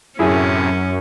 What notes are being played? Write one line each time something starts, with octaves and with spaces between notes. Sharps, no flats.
F#2 A2 C3 C#4 E4 G#4